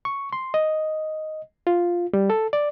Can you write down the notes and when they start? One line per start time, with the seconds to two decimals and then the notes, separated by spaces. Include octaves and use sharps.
0.05 C#6
0.33 C6
0.54 D#5
1.67 F4
2.13 G3
2.30 A4
2.53 D5